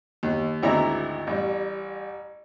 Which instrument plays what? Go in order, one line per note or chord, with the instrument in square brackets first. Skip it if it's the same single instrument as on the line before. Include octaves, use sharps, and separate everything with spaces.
[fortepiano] D#2
G#1 D2 E4 D5 A#5
A1 G3